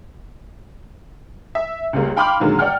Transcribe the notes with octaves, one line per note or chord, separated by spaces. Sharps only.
E5
C#2 C#3 G3 A#3
F5 G5 B5 C6 D6 F6
A#2 D3 D#3 F#3 G#3 A#3
D5 F#5 G5 F6